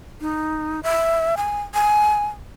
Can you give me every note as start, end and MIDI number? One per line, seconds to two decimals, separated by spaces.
0.21 0.80 63
0.83 1.35 76
1.37 1.61 80
1.74 2.26 80